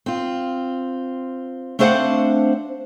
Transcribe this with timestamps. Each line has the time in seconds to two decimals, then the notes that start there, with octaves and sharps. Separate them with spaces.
0.06 C4 F4
1.79 A3 C4 D4 C5 F5 F#5